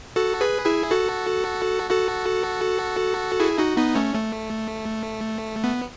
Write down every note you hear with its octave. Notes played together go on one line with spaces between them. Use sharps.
F#4 A4
G#4 B4
E4 G#4
F#4 A4
F#4 A4
E4 G#4
D#4 F#4
B3 D#4
A3 C#4
A3
B3